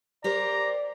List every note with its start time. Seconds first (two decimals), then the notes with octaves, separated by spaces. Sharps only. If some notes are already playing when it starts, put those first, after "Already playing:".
0.24 G4 A#4 C5 D5 A#5